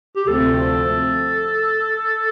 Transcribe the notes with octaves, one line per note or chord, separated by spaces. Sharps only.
G4
D2 C3 F3 A3 C4 A4